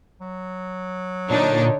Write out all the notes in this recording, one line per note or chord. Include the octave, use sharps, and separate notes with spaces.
F#3
A#2 D3 D4 D#4 C#5